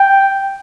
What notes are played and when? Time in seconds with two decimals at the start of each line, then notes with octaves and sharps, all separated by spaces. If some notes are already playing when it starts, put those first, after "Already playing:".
Already playing: G5